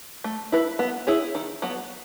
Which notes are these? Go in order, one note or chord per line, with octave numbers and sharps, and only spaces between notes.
A3
E4 B4
B3
E4 G#4 C#5
D#3
F#3 B3